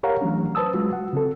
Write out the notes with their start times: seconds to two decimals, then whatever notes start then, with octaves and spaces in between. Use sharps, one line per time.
0.03 G4 A#4 C#5 F5 F#5 A#5
0.21 E3 F#3 A3 C#4 D4
0.55 B4 C5 A5 D#6 E6
0.74 F#3 G#3 F4 F#4
0.93 F#5
1.13 C#3 C4 A4